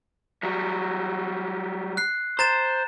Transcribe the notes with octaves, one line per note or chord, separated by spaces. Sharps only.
F#3 G3
F#6 C7
C5 A#5 A6 E7